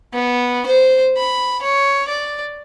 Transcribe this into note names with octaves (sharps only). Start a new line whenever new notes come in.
B3
C5
B5
C#5
D5